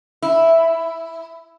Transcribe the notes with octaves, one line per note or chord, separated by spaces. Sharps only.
E4